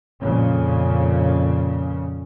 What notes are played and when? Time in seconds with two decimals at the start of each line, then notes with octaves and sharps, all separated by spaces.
0.21 F2 A#2 C#3